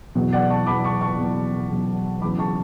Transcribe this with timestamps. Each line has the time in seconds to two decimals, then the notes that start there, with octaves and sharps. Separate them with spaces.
0.15 E2 B2 F#3
0.32 D5 F#5
0.49 A5 C#6
0.66 E2 B2 F#3 B5 D6
0.84 A5 C#6
1.01 A5 C#6
1.18 E2 B2 F#3
1.70 E2 B2 F#3
2.21 E1 E2 C#3 F#3 B5 D6
2.38 A5 C#6